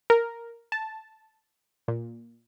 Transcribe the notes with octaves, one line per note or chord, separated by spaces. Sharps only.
A#4
A5
A#2